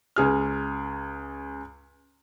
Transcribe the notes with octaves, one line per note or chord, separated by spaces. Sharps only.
C#2 G#4 F6